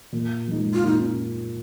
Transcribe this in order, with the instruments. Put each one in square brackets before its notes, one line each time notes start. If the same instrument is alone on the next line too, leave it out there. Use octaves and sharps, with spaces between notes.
[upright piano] A#2
F3 G#3 D#4
[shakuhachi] F4
[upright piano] A#2 [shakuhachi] D#4
[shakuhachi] C#4